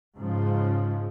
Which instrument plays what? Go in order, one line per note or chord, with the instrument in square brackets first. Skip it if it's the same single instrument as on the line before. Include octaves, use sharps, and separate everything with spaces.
[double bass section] G#2 C#3 F3